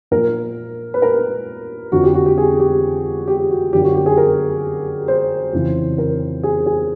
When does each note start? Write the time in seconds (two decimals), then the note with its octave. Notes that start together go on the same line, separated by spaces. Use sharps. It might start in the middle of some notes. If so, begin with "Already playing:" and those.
0.11 A#2 F3 A#4
0.94 B4
1.02 A#4
1.92 F2 D3 F3 F#4
2.04 G4
2.14 F#4
2.26 G4
2.38 G#4
2.60 G4
3.28 G4
3.50 F#4
3.73 F#2 D3 F3 G4
3.84 F#4
3.95 G4
4.06 G#4
4.17 A#4
5.08 C5
5.53 F2 C#3 E3
5.98 A#4
6.43 G#4
6.66 G#4